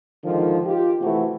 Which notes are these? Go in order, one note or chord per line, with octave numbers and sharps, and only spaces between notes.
G#2 D3 D#3 F3
F4 G4
C3 E3 A3 E4 F#4